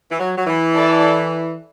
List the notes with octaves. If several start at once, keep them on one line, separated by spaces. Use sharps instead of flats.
E3
F#3
F#3
E3
E4 A4 D5